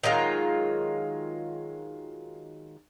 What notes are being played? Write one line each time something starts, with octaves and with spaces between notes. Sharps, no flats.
D#3 F#3 G#3 F4